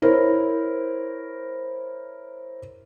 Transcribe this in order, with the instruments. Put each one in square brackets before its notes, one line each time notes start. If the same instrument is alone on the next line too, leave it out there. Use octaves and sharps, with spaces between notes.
[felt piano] E4 A#4 C5 C#5